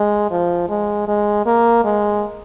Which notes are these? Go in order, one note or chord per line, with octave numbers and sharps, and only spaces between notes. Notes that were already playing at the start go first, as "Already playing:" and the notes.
Already playing: G#3
F3
G#3
G#3
A#3
G#3